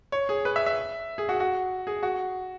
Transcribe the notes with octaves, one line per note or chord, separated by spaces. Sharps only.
C#5
G#4
B4
E5
E5
G#4
F#4
F#4
G#4
F#4